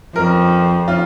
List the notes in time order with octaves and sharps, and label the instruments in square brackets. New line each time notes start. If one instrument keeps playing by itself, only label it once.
[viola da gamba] F2 [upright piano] A#4
[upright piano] F4